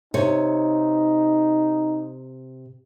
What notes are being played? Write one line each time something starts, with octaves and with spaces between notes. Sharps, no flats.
C3 D#4 C#5